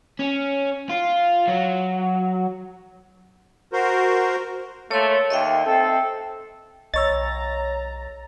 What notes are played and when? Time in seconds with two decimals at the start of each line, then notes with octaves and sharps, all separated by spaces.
0.19 C#4
0.89 F4
1.48 F#3
3.73 F#4 A#4 C5
4.91 A3 A#3 C#5 C6
5.30 D#2 D#5 E5 G5
5.66 C4 A4
6.94 B1 C#5 D#5 A#5 E6 A6